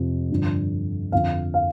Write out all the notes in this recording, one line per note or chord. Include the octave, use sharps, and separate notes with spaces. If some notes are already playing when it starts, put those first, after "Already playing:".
Already playing: F2 C3 F3
G2 D3 F3 D4
F2 D3 F3 F5
F5